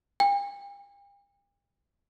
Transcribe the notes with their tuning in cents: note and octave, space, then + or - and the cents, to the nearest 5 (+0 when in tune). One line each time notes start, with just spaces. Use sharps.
G5 +40